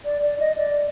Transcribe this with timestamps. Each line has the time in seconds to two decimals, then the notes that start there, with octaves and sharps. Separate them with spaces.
0.05 D5
0.22 D5
0.40 D#5
0.57 D5